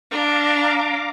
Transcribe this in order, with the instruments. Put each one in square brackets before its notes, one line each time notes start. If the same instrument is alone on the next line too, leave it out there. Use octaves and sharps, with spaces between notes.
[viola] D4 [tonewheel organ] F5 A#5 D6